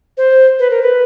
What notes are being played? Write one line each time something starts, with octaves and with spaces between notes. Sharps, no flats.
C5
B4
A#4
B4